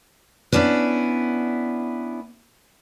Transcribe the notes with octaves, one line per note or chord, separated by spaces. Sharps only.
B3 C#4 D4 E4 B4